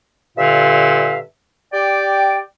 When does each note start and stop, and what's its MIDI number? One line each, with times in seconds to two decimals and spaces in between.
0.37 1.18 43
0.37 1.18 46
0.37 1.18 50
0.37 1.18 76
0.37 1.18 77
1.72 2.38 67
1.72 2.38 74
1.72 2.38 79